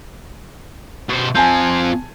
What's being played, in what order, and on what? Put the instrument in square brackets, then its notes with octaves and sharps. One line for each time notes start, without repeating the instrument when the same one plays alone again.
[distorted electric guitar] B2 C5
[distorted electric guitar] C4 F4 [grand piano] G#5 A5 G6